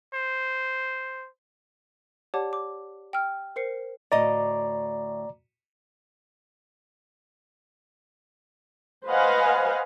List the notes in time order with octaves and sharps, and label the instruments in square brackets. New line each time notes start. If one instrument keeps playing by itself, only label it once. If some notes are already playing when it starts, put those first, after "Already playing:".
[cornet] C5
[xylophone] G4 C#5 D5 F#5 A5 D6
D6
G5 E6 F6
A#4 C5 C7 C#7
[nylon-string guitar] D2 A2 D#5 [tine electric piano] D5 A#5 D6
[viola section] B4 C5 D#5 F5 F#5 G#5